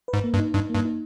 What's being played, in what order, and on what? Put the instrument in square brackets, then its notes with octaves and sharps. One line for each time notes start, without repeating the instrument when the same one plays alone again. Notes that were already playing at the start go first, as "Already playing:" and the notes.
[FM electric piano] B4
[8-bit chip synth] G#2
[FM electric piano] A#3
[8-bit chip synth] G2
[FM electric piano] D#4
[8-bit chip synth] G2 [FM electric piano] D#4
[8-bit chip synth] G2 [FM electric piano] A#3
[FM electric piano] D#4